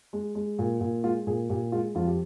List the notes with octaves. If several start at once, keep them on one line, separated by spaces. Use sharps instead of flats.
G#3
G#3
A#2
A#2
G#3 F4
A#2 G#4
A#2 G4
G#3 F4
F2 F4
G4